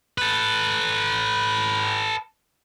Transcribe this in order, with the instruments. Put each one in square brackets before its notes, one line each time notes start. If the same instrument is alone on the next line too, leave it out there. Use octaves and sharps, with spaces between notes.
[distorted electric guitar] A4 B4